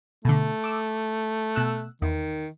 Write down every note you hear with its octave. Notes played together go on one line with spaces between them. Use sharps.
B2 D3 A3
D6 E6
B2 E6 F#6
E2 D#3